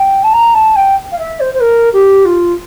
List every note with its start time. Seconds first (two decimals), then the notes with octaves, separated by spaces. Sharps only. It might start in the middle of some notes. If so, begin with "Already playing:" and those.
Already playing: G5
0.23 A5
0.33 A#5
0.54 A5
0.75 G5
1.11 F5
1.18 E5
1.40 C5
1.53 C5
1.60 A#4
1.93 G4
2.25 F4